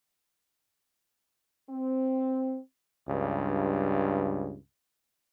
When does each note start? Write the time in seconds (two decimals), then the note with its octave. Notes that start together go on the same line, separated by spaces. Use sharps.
1.69 C4
3.08 C#2 G2